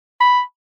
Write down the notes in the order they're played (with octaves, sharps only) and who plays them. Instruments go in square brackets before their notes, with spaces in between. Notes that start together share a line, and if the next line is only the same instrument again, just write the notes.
[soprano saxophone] B5